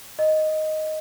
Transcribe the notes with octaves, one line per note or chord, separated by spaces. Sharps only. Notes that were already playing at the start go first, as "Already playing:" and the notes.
D#5